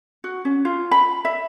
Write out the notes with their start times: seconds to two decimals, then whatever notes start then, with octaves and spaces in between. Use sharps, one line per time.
0.24 F#4
0.45 C#4
0.65 F4
0.91 B5
1.25 E5